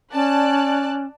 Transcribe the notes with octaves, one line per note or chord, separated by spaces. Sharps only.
C#4 D5 A5 F#6